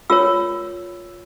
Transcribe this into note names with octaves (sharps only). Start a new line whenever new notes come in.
F4 A#4 C#5 E6